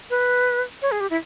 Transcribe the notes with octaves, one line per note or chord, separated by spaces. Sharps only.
B4
C#5
G#4
G4
E4